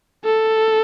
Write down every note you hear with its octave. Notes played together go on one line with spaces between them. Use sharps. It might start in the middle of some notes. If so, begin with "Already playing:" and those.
A4